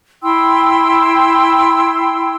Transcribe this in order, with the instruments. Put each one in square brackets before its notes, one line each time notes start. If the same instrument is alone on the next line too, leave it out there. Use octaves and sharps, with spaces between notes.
[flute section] E4 G5 C6 E6